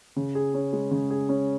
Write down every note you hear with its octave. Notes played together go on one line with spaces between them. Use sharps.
C#3
G#4
C#4
G#3
C#3
G#4
C#4